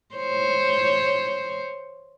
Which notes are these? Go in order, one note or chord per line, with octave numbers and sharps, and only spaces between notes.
C5 C#5